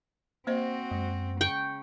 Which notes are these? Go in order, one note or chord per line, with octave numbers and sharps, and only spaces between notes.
A#3 C4 F#4 C5 D#5
F#2 G#3
C#3 G5 C#6